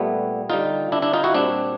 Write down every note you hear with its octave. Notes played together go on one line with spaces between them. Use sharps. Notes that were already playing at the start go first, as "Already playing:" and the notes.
Already playing: A#2 G3 A3 B3
D3 G3 D#4 F4
D4 E4
D4 E4
D#4 F4
E4 F#4
A#2 G3 C4 D4